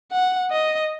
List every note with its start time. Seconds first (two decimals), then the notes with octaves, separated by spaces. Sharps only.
0.12 F#5
0.51 D#5